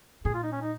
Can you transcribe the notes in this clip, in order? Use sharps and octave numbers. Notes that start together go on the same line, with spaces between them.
A#2 G#4
F4
D#4
C#4
D#4